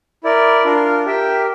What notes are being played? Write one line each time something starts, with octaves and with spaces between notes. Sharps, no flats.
E4 A#4 D5
D4 F4 A#4
G4 A#4 E5 G5